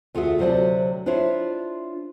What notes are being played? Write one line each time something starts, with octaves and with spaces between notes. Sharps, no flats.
D2 F4 F#4 G#4 E5
D2 C3 F#3 C5 D5 A5
D4 E4 F4 C5 C#5 E5